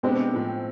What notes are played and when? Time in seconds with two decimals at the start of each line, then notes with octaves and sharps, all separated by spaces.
0.03 B2 G#3 B3 C4 D4 G4
0.32 A2 F3 G#3